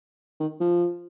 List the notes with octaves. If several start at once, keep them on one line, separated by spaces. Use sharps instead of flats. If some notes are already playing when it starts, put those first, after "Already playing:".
D#3
F3